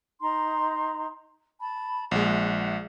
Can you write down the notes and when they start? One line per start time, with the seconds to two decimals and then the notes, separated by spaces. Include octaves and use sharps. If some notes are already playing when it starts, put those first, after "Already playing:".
0.22 D#4 A#5 C6
1.60 A5 B5
2.11 A#1 G#3 E5 F#5